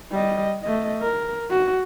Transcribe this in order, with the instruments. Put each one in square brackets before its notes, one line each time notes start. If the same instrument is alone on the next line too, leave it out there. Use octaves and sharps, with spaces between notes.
[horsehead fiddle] G3 D#5
A3 D#5
A#4
F#4